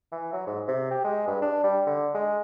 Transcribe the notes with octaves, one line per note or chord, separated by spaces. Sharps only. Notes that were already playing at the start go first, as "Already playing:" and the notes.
E3
F#3
G#2
C3
G4
G#3
G2
D4
G3
D3
G#3